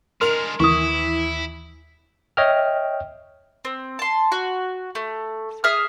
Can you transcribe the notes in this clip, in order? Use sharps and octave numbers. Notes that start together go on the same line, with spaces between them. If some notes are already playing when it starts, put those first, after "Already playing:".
G#3 D4 A#4 C6 F6 F7
D#2 E3 E4 C#6 D#6
C#5 D#5 E5 G5 F6
C4
A5 C6
F#4
A3
G#4 E5 D#6 F6